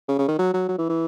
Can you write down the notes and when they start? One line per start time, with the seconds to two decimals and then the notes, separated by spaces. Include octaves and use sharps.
0.08 C#3
0.19 C#3
0.28 D#3
0.38 F#3
0.54 F#3
0.69 F#3
0.78 E3
0.89 E3